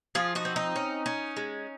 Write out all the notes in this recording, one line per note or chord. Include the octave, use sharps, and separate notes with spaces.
F3 F4 G#4
D#4 F#4
C4
D#4
C#4
C#4
G#3